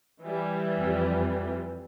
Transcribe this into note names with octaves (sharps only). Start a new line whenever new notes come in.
E3 G3
F2